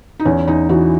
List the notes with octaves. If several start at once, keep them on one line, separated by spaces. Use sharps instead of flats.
D#4
E2 C#4
E2 D#4
E3 F#4